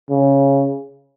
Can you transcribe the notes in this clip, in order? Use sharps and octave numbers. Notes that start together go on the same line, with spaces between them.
C#3